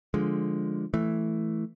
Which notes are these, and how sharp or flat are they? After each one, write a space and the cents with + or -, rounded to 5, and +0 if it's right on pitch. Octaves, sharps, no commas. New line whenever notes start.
D3 +0 F3 +5 G#3 +0
E3 +0 A3 +0